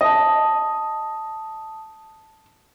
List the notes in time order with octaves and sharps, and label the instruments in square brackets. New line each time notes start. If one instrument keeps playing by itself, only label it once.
[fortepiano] D#5 [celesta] A5 D#6